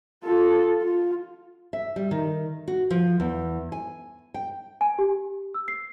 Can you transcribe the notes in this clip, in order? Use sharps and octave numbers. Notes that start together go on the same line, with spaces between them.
F4 A4
F4
E5
G3
D#3
F#4
F3
E2
G#5
G5
G#5
G4
E6
C7